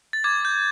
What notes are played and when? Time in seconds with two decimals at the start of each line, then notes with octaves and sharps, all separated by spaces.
0.13 A6
0.24 D6 G#6
0.45 G6